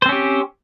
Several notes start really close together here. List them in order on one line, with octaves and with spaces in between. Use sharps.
C5 C4 C#4 G4